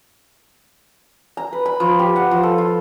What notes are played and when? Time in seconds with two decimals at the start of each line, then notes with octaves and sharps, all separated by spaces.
1.37 A#5
1.53 B4
1.66 B5
1.80 F3
1.99 G4
2.16 F#5
2.31 F3
2.43 A4
2.58 F4